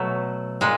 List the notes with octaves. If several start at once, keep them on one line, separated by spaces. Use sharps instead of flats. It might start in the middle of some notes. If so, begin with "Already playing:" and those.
Already playing: B2 F#3 A3
A#2 G#3